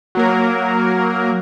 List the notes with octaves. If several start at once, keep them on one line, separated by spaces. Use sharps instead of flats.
F#3 A#3 A#4